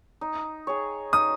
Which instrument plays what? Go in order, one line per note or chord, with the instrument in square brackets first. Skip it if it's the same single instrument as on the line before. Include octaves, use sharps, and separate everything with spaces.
[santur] D#4
G#4 C#5
[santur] D#4 [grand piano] D#6